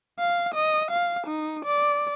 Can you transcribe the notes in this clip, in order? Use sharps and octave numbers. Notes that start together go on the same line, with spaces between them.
F5
D#5
F5
D#4
D5